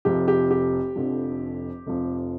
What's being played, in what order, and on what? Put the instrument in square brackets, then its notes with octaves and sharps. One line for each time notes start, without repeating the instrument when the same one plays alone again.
[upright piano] F1 F2 C3 F3 G4
G4
G4
F1 F2 D3 F3
F1 F2 F3